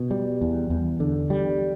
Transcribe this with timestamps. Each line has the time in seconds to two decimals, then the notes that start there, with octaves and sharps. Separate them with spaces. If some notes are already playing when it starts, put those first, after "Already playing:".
Already playing: B2
0.11 G3
0.41 E2
0.70 E2
1.00 D3
1.30 G3